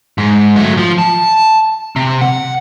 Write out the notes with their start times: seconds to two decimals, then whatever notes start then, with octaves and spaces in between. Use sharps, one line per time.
0.18 G#2
0.56 F#3 A3
0.77 F3
0.98 A5
1.96 C3
2.21 F#5